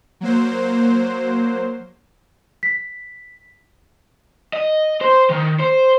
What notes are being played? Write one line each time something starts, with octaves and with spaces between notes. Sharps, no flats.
F#3 A#3 C5
B6
D#5
C5
D#3
C5